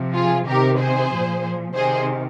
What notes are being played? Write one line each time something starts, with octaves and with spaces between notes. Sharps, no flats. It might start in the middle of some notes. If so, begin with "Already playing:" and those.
Already playing: C3 F3
F4 G#4
C3 D#3 G4 A#4
G#4 C5
A#2 F3
C3 D#3 G#4 C5